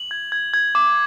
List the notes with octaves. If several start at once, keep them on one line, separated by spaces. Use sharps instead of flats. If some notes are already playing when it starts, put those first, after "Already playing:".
Already playing: F#7
G#6
G#6
G#6
D6